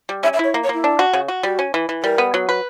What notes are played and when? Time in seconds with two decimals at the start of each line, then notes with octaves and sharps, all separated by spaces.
0.09 G3
0.23 C#4 E5
0.33 E5
0.39 E4 C#5
0.54 A#3
0.64 C#5
0.69 A#3 E4
0.84 D4
0.99 F#4
1.13 C#3
1.28 F#4
1.43 G3 F#4
1.59 C#4
1.74 E3
1.89 E3
2.03 G3 A#4
2.18 B3
2.34 F#3
2.49 B4